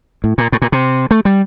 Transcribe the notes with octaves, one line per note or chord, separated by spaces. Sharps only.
A2
A#2
A2
A#2
C3
A3
G3